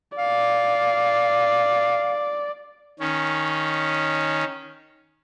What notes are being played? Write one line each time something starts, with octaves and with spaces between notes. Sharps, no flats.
D5 F5
D#3 C#4